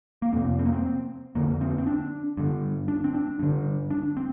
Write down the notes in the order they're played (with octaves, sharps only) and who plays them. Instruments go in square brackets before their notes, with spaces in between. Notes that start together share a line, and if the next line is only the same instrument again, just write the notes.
[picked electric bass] A#3
F2 C3 C4
C4
A#3
C4
F2 D3 A#3
C4
C4
D4
G2 D3
D4
C4
D4
G2 D3
D4
C4